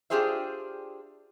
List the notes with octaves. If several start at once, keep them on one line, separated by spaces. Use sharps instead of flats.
D4 F4 G4 G#4 C5 E5